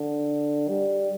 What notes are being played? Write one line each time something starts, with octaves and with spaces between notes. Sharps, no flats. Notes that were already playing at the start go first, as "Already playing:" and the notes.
Already playing: D3
G3